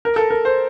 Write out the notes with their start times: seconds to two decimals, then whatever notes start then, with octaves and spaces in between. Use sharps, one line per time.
0.05 A#4
0.16 A4
0.30 A#4
0.45 C5